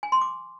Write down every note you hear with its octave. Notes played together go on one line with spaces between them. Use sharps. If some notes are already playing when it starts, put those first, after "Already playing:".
G#5
C6
D6